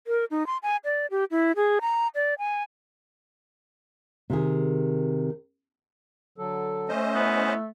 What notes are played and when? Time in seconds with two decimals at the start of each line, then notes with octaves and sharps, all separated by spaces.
0.07 A#4
0.31 D#4
0.47 C6
0.63 G#5
0.85 D5
1.11 G4
1.31 E4
1.56 G#4
1.81 A#5
2.15 D5
2.39 G#5
4.30 C3 D#3 G#4
6.38 D3 F#3 A4
6.89 A3 C#4 C5 D#5
7.14 B3 E4